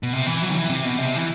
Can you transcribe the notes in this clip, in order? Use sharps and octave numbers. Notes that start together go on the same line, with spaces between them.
B2
C3
E3
F#3
D#3
E3
C3
B2
C3
E3